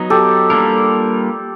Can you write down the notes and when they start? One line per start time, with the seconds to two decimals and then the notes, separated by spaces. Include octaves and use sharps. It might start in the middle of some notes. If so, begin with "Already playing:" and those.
Already playing: F#3 B3 D#4
0.10 G4 A4
0.50 G3 A#3 D4 F4 A#4